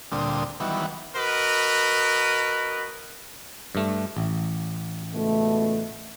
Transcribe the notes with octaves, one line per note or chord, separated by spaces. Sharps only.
D2 A#2 D3 G3 C4 D#6
D#3 E3 F#3 G3 B3
F#4 A#4 B4 D#5
G2 A3
A1
C#2 B2 A3